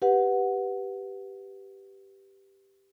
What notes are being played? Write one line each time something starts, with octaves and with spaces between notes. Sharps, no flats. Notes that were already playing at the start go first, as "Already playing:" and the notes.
G4 B4 F#5